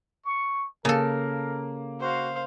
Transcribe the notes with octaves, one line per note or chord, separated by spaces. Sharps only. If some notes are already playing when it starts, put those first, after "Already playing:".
C#6
C#3 A#3 A4 A#4
F#4 C5 F5